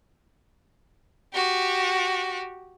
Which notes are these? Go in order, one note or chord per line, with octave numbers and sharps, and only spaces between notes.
F#4 G4